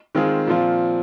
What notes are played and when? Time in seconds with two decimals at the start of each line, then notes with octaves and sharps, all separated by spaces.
0.15 D#3 G#3 C4 F4 G#4
0.47 A#2 F3 C4 F4